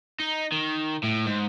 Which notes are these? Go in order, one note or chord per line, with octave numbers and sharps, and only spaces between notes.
D#4
D#3
A2
G#2